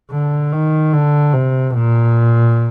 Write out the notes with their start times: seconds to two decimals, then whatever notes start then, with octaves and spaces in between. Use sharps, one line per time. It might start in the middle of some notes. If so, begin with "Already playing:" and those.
0.11 D3
0.53 D#3
0.93 D3
1.33 C3
1.74 A#2